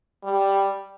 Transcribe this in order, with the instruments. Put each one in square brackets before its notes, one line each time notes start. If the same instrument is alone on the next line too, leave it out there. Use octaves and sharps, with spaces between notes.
[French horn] G3